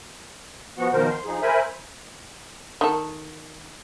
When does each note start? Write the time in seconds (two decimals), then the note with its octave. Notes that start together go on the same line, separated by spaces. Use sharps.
0.78 F3 B3 F#4 F#5
0.93 B2 D#3 F3 A#4 C5
1.10 C6
1.25 F3 D#4 G#4
1.42 A#4 C5 E5 G#5 B5
2.81 D#3 A4